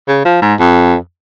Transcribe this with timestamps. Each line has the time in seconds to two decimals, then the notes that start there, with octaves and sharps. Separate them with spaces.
0.08 C#3
0.25 F3
0.42 G#2
0.59 F2